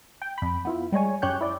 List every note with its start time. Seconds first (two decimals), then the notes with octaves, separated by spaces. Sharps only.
0.22 G5
0.38 F2 B5
0.65 B3 E4 F4
0.92 G3 G#3 C#5 G#5
1.22 F#2 C#4 G4 C#5 F#6 G6
1.41 E4 D5